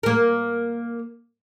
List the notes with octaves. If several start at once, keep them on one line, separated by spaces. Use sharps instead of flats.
A#3 A#4